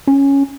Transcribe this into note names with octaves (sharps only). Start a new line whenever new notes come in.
C#4